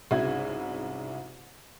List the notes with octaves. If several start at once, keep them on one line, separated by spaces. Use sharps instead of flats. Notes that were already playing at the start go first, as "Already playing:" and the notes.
C2 G#2 C#3 E4 F#4 G#6